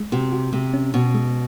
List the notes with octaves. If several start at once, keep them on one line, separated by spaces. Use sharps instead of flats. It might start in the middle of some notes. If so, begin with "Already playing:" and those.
Already playing: G#3
C3 F#4
F#4
C3 G#3
C#4
B2 C#4
G#3